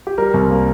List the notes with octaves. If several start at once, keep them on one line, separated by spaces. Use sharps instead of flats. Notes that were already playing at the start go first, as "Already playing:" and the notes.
G4
G3 A#4
C2
A#3